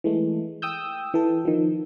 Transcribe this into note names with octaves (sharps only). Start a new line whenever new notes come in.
E3 G#3 A3
G5 D#6 E6 G6
E3 A4
D#3 F3